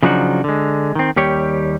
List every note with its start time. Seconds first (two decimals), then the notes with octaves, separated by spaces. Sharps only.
0.03 C#3 F3 F#3 D4 D#4 F#4
0.44 D3 G#3
0.95 D#3 C4
1.16 D#2 G3 G4 C#5